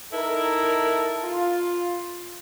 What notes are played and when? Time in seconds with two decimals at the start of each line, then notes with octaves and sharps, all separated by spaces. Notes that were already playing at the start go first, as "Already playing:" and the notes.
0.13 D#4 E4 A4 A#4
1.24 F4